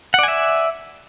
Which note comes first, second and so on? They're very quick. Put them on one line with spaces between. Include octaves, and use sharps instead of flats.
F#5 D5 G#5 E5